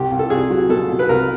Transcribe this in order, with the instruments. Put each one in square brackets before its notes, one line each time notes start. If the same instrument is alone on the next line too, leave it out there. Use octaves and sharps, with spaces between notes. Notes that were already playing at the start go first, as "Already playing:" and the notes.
Already playing: [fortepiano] C2 G4
C2
A4
C2 G#4
F#3
B2 A4
B2
B4
C2 A#4